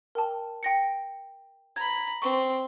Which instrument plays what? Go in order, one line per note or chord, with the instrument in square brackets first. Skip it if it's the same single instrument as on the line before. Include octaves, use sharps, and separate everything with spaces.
[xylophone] A#4 G5 A5
G5 A#6 C#7
[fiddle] A#5 B5 [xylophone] G#6
[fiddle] C4 [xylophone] C#6